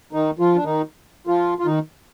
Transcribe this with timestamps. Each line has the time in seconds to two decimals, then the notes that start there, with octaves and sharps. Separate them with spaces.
0.13 D#3 D#4
0.39 F3 F4
0.55 D4
0.64 D#3 D#4
1.27 F3 F4
1.59 F4
1.66 D#3 D#4